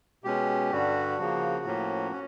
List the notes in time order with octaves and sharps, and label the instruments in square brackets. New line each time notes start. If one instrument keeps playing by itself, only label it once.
[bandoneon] B2 G#3 C#4 G4
G2 D3 G3 F#4
C#3 F3 A#3
A2 F3 A#3 C#4
C#4